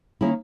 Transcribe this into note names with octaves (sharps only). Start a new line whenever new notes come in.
D#3 A#3 C#4 E4